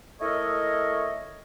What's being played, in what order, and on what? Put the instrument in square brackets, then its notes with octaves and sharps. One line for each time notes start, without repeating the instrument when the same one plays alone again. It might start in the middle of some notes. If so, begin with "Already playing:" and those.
[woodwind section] A3 E4 A4 A#4 C#5 D#5